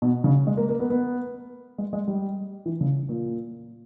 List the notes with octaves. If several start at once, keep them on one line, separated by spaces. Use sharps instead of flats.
B2
C#3
G#3
A#3
A#3
B3
B3
G#3
G#3
G3
E3
C#3
A#2